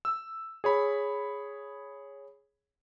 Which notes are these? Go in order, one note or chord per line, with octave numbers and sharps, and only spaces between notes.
E6
G#4 C#5 B5